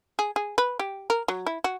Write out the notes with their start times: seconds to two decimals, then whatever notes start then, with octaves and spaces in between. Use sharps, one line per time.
0.19 G#4
0.36 G#4
0.58 B4
0.79 G4
1.10 A#4
1.28 F#3
1.46 E4
1.64 F#4